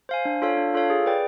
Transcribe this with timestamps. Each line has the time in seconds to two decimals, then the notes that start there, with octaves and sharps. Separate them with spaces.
0.09 C5 F5 G#5
0.25 D4
0.42 F4 A4 C#5 F5
0.57 D4
0.74 F4 A4 C#5 F5
0.90 G#4
1.06 B4 D5 G5